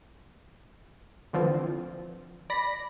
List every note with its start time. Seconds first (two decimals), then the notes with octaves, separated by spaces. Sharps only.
1.33 D3 E3 F3 C4 F4
2.50 D5 B5 A#6